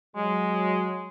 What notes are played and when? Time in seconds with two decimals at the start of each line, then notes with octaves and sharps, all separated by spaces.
0.16 F#3 G#3